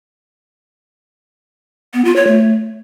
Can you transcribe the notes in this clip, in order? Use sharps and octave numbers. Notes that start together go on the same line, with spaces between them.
B3
F4
C#5
A3